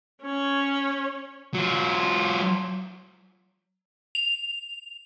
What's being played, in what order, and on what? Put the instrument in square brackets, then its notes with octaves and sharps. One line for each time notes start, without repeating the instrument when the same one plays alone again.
[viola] C#4 C#5
[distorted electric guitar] F#3 F4
[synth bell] F7